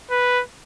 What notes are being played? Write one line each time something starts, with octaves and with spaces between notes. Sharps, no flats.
B4